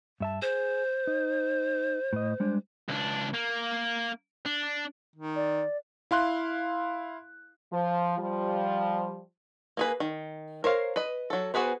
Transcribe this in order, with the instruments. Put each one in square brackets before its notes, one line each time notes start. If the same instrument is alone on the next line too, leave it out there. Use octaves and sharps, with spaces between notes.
[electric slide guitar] G2 E5 A5
[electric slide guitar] G#4 [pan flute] C5
[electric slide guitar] D#4
A2 D#5
G3 G#3 D4
[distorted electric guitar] C#2 D4
A#3
D4
[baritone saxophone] D#3
[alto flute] D5
[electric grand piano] E4 F5 C6 F#6
[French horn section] F3
F3 G3
[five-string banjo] A#3 G#4 B4
D#3
A#4 C5 C#5 F5
B4 D#5
F#3 A4
B3 F#4 G#4 B4 C5